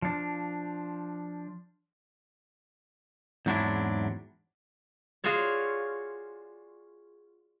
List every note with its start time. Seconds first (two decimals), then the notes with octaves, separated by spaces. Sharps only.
0.02 F3 D4
3.46 E2 G#2 F#3 C4 D4 E4
5.24 F4 F#4 G#4 C#5 D5